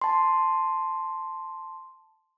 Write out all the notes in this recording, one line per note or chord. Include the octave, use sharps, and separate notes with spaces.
A5 C6